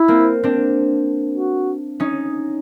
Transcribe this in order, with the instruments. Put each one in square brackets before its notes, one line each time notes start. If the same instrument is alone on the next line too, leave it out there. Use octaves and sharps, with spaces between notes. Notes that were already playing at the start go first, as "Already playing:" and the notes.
Already playing: [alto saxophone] E4
[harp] A#3 C4
C4 D4
[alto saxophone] F#4
[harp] C#4 D#4